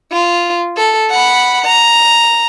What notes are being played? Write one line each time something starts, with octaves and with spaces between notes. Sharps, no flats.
F4
A4
F#5 B5
A#5